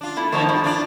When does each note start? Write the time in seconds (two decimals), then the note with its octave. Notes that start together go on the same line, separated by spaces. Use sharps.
0.01 D4 F4
0.17 A3 E4
0.32 D3 F3 A3 C5 C#5 A5
0.49 G2 F3 E4
0.64 D4 F4 D5